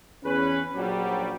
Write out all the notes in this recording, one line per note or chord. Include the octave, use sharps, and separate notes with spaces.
E2 C#4 B4
A#1 F#3 G3